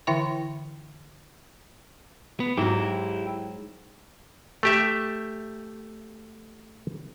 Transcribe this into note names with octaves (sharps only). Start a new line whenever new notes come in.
D3 E3 E4 E5 G5 C#6
B3
G#2 F#3 E4 G4
A3 G4 E5